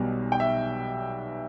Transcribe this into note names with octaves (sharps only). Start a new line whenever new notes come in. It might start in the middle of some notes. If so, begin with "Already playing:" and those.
Already playing: B1 B2 G3
G5
E5